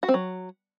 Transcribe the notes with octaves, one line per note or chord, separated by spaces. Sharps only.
F#4
C4
F#3